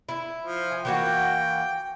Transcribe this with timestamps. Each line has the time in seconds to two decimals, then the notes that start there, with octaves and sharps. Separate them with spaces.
0.09 E4
0.43 F3
0.72 G#5
0.85 E3 A#3 F#4 G5